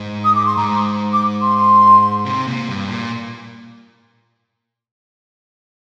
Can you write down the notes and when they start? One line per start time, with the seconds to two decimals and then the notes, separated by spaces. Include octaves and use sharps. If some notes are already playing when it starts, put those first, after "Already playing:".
Already playing: G#2
0.25 D#6
0.35 D6
0.46 C6
0.57 G#2 A#5
1.13 D6
1.41 C6
2.25 C3
2.47 A#2
2.68 G2
2.89 A#2